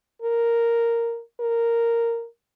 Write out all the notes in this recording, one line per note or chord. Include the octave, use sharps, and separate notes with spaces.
A#4
A#4